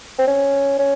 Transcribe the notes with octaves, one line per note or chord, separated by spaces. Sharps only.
C4
C#4
C#4